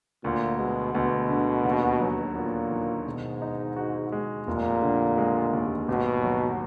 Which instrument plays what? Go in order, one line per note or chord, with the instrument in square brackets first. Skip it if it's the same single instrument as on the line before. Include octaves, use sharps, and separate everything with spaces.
[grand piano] D2 [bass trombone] A#2
[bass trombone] B2 [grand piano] G#3
[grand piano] D2 [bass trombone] B2
[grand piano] D3
D#2
F#3
[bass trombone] A#2 [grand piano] B3
[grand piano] D#3
[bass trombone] G#2 [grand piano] B2
[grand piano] D#4
F#4
G#3
[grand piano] F1 [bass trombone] A#2
[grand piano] D3
G#3
D#2
[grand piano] G#1 [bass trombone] B2
[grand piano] F#3